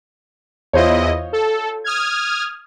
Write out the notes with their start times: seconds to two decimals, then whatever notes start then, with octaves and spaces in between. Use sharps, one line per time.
0.73 E2 E4 F4 C5 C#5 D#5
1.33 A4
1.84 D#6 F6 G#6